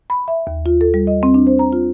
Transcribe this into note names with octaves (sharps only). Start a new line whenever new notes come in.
B5
E5
D#2
F4
A4
G3
D#5
C4
D4
C5
A#5
F4